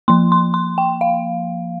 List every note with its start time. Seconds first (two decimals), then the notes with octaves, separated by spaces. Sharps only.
0.08 F3 A#3 C6
0.32 C6
0.54 C6
0.78 G5
1.01 F5